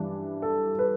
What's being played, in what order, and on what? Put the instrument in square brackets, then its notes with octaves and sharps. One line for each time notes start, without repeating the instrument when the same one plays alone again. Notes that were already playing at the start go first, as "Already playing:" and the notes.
Already playing: [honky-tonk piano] G2 E3 G3 D4
[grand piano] A4
B4